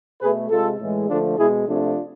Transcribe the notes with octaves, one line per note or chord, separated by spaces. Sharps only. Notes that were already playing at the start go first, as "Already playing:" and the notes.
B2 A3 G#4 B4
C3 G#3 F4 A4
A2 E3 G#3
D3 F3 A3 D4 F4
B2 G#3 E4 G#4
C3 F3 A3 D4 F4